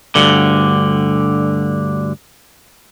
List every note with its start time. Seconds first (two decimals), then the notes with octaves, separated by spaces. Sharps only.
0.15 D2 G2 D3